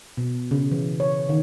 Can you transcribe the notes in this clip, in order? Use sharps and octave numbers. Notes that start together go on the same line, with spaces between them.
B2
C#3
E3
C#5
D#3